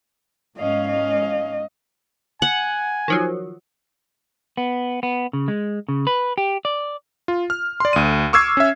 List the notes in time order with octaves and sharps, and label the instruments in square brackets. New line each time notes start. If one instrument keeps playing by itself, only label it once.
[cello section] G#2 C#4 F5 [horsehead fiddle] D#5
[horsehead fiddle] D#5
[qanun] F#5 [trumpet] G#5
[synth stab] D#3 F3 F#3
[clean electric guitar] B3
B3
C#3
G#3
C#3
B4
G4
D5
[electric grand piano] F4
F6
D5 C6
D2 D#7
C#6 D6 E6 F6 G#6 C7
C#4 E5